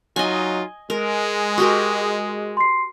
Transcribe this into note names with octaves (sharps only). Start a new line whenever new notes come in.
F#3 D#4 F4 D#5 G#5
G#3 A#4
F#4 G4 A#4 D#6
C6 C7